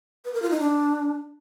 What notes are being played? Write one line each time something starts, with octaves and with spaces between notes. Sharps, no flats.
B4
A#4
F4
D#4
D4